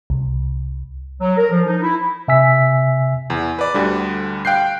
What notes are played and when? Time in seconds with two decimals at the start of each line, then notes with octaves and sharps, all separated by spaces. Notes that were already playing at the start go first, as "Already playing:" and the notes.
0.10 C2
1.21 F#3
1.37 A#4
1.51 F3
1.66 D#4
1.82 E4
2.28 C3 E5 G#5 E6 B6
3.30 E2
3.59 B4 D5
3.74 D2 D3 G3
4.45 F5 G5 F#6 G6 C7